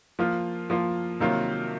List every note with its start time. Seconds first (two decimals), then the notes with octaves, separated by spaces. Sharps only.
0.19 F3 A#3 F4
0.70 F3 A#3 F4
1.20 C3 D#3 F#3 A#3 F4